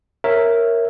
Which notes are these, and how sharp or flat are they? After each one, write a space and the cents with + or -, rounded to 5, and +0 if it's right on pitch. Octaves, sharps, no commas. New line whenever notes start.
A#4 -5 C#5 -15 E5 +0